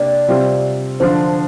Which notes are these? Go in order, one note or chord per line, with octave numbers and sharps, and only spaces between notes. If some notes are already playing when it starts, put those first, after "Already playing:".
Already playing: C3 A#3 D4 G4 D5
C3 G3 C4 F4
D3 F3 D4 F4 C5